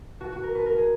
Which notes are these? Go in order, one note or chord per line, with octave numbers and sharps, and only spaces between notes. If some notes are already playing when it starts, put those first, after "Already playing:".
B2 F#4
F#4
B2
A#4
B2 B4
A#4
B2
G#4